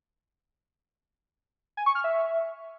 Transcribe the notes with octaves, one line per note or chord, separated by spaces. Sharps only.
G#5
C#6
F6
E5